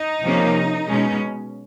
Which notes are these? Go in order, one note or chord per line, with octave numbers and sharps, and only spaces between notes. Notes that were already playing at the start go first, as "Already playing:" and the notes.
Already playing: D#4
C3 F3 A#3 C#4
B2 G#3 C#4